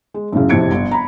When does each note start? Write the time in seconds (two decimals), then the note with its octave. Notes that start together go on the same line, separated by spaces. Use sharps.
0.14 G#3
0.32 F#2 A2 C#3
0.49 F2 A2 C3 G#6 C#7 D7
0.71 G1
0.91 A#5 B5